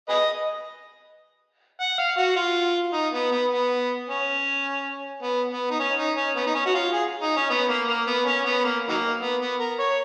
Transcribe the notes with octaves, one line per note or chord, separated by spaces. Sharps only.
G#4 B4 D#5
F#5
F5
F#4
F4
D#4
B3
B3
B3
C#4
B3
B3
D#4
C#4
D#4
C#4
B3
D#4
C#4
F#4
F4
G#4
D#4
C#4
B3
A#3
A#3
B3
C#4
B3
A#3
D#3 F#3 A#3
B3
B3
A#4
C#5